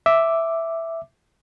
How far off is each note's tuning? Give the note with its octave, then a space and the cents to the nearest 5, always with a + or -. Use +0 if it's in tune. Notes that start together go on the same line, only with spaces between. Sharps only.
E5 +0 D6 +0